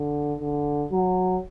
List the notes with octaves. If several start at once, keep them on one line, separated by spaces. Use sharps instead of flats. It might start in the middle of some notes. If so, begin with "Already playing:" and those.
Already playing: D3
D3
F#3